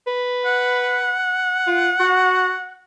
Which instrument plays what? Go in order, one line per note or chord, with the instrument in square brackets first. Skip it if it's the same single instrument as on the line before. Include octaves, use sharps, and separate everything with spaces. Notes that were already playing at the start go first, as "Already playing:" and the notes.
[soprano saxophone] B4
[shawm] F#5
[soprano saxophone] F4
F#4